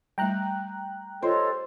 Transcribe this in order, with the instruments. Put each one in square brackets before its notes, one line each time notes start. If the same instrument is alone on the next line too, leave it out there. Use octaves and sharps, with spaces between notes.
[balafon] G3 A3 [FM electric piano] G5 A#5 F#6
[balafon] F4 [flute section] A4 C#5 D#5 [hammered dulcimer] C5